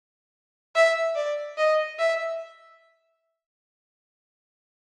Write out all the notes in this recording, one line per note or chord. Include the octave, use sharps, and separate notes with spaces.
E5
D5
D#5
E5